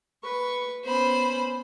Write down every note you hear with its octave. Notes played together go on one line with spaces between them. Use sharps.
B4 C#6
B3 C#4 C5 B5